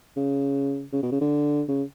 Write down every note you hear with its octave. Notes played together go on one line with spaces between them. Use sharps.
C#3
C#3
B2
C#3
D3
C#3